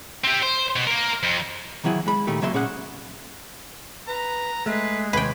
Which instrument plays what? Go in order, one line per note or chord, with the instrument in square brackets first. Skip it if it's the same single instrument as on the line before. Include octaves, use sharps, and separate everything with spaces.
[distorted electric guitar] C4 G4
C5
B2
A#3 A#4
F2
[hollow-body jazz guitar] D#3 E3 F#3 E4 G#4
G#3 B5
A#2 D#3 A3 G4
C#3 F#3 A#3 E5 C6
A#2 C#4 G#4 F#5
[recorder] B4 [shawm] A#5
[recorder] G#3 [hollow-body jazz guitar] A3 [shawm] B4
[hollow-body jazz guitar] D#2 C3 [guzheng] B4 G5 [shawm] G#5